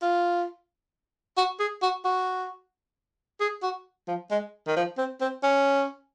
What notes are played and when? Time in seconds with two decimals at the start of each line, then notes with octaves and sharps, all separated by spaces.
0.02 F4
1.37 F#4
1.60 G#4
1.82 F#4
2.05 F#4
3.40 G#4
3.63 F#4
4.08 F3
4.31 G#3
4.67 D#3
4.76 F3
4.98 C4
5.21 C4
5.43 C#4